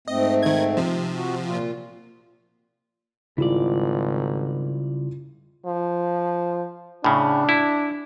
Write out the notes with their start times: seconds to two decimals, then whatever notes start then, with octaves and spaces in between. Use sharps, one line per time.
0.08 G#2 A3 C4 D#5
0.43 D#3 G#6
0.77 C3 F3
1.15 F#4
1.43 A#2 F4
3.38 G#1 C#3 G3 E4 F4 D5
5.66 F3
7.04 A2 C#3 D4
7.49 E4